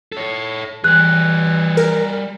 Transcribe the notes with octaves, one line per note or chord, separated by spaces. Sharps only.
A4 C#5
E3 G3 G#4 F#6
A#4